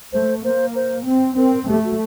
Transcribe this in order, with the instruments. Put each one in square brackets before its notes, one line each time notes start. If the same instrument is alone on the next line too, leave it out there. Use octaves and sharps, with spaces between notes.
[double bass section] A3 [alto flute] C5
[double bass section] A#3 [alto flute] C5
[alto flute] C5
[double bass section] C4
[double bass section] C4 [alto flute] A#4
[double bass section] A3 [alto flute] G4
[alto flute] F#4